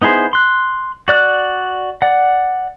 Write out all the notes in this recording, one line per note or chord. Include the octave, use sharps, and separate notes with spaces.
B3 D#4 E4 G#4 C5
C6 F#6
F#4 D5 F#6
D5 F#5